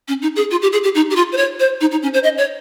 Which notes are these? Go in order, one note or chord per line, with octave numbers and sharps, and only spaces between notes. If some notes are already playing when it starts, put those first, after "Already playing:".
C#4
D#4
G#4
F4
G4
G#4
G4
D#4
G4
F4
C5
C#5
C5
D#4
D#4
C#4
C5
D#5
C#5